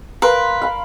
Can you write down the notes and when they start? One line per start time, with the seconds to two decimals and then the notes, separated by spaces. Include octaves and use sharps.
0.22 A#4 B4 F5 C6
0.62 F5 B5